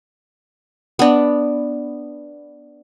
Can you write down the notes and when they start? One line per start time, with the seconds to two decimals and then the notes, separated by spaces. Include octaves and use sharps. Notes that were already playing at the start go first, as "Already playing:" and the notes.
0.99 B3 D4